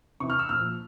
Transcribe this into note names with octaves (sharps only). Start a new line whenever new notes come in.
C3 E3 C#6
F6
E6
A#2 F3 F6